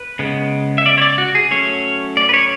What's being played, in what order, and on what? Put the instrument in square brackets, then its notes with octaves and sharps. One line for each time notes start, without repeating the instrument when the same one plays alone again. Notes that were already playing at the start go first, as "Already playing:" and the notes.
Already playing: [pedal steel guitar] B4
C#3 G#3 B3
E5
D5
C#5
D5
F#4
G#4
F#3 A3 C#4 C#5
D5
B4
C#5